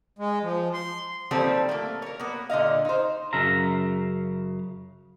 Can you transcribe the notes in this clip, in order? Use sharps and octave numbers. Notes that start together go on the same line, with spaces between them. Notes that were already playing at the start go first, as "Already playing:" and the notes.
G#3
F3
C6
D#3 F3 G3 A#3 C4 A4
A3 A#3
A#4 C#5
A#3 B3
A#2 D3 D#5 F5
D#4 C5
F#2 C#3 E5 F5 A#5